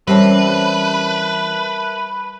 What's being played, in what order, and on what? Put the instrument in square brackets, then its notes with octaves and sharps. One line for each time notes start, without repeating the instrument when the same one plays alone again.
[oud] E3 C4 C#4 [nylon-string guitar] G3 [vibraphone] A#4 E5 A5 [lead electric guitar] B4